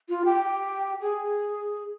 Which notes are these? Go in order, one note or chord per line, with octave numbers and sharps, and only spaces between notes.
F4
G4
G#4